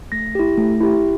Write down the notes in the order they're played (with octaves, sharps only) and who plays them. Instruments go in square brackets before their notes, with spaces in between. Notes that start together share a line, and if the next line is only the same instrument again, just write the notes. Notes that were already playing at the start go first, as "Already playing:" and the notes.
[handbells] A3 A#6
E4 G4
A3
E4 G4